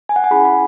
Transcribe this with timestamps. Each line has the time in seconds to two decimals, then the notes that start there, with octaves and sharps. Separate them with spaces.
0.09 G#5
0.16 F#5
0.24 G#5
0.31 C#4 E4 G#4 B5
0.45 B5